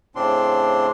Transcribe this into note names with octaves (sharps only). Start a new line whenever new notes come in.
A2 C#3 C4 D4 C6